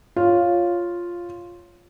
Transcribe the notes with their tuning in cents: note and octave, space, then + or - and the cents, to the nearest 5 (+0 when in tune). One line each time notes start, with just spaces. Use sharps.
F4 +0 C#5 +0